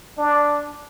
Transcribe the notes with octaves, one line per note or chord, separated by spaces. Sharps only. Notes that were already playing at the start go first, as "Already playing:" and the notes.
D4